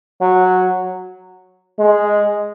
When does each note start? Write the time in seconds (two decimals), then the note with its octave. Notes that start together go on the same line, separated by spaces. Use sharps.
0.21 F#3
1.79 G#3